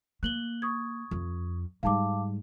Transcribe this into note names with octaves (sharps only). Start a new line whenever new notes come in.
A#3 F#6 F#7 G7
C#6 D#6 G#6
F2
G#2 G3 F5 A5 D6